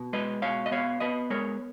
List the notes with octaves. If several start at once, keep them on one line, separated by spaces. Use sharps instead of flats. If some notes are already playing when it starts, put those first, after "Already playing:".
Already playing: B2
G#3 B4 D#5
B2 C#5 F5
D#5
B3 C#5 F5
B3 B4 D#5
G#3 A#4 C#5